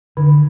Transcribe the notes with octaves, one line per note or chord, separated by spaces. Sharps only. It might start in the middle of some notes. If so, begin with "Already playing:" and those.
D3 D#3